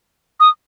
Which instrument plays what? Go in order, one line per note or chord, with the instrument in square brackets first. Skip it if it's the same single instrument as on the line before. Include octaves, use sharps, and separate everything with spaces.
[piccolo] D#6